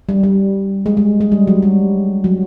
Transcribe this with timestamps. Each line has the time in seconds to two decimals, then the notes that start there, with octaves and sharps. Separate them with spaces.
0.09 G3
0.23 G3
0.86 G#3
0.97 G#3
1.21 G#3
1.32 G3
1.47 F#3
1.62 G3
2.24 F#3